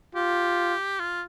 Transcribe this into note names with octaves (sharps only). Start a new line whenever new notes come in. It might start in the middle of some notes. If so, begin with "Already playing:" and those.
F4 G4
F4